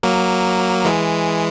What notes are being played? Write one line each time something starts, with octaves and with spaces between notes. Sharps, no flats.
F#3 A#3
E3 G#3